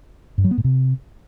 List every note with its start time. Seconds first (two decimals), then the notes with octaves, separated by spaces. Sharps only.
0.38 G2
0.44 F#3
0.51 B3
0.58 A2
0.64 C3